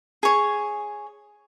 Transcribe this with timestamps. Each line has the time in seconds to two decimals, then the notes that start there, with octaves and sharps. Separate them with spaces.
0.23 G#4 C#5